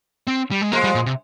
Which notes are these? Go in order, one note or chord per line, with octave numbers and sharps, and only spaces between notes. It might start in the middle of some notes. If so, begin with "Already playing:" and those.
C4
G3
G#3
F3 G#3 A#3
G3
A#2
C3